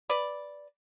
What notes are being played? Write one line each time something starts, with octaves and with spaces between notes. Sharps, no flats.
B4 D5